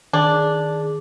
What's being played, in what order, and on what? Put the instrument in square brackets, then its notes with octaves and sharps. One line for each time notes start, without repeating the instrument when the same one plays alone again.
[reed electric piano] D#3 [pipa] D4 [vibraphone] G#4